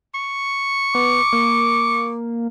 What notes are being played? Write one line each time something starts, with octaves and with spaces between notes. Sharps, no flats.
C#6
B3 D6
A#3